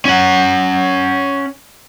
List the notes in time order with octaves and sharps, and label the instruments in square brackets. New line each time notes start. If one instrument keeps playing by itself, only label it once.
[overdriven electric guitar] C#4 F#5